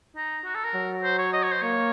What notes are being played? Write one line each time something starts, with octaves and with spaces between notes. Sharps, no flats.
D#4
F#4
A4
A#4
F#3
C5
C#5
D#5
C#5
C5
A#3 C#5